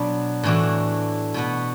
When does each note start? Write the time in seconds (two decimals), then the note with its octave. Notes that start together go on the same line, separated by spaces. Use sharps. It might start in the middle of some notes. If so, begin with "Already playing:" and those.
Already playing: B2 F#3 B3 D4
0.43 A2 E3 D4 F#4
1.34 B2 B3 F#4